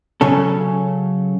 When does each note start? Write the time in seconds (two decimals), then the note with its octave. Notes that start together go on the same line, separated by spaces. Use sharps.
0.21 C#3 F#3 C#4 A4